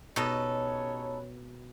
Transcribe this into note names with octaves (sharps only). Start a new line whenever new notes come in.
B2 C#4 D#4 G4 A4 B4 C#5